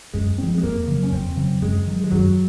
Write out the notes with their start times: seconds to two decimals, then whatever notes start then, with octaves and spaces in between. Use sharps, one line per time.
0.14 F#2 G#3
0.38 F3 C4
0.58 G#3
0.63 F2 A#3
0.87 C#3 F#3
1.03 C#4
1.12 F2 C4
1.37 C#3 F#3
1.62 F#2 G#3
1.87 D#3 F#3
2.04 G#3
2.11 F#2 F#3